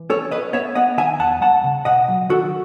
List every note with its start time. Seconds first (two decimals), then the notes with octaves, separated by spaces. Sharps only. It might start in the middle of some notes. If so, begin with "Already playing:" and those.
Already playing: E3
0.10 C#4 A4 C#5
0.31 C#4 B4 D#5
0.53 B3 C#5 E5
0.75 B3 D#5 F#5
0.98 D#3 E5 G#5
1.19 E2 F#5 A5
1.41 G#3 F#5 A5
1.64 C#3
1.85 B2 D#5 F#5
2.08 F#3
2.30 D#3 F#4 A4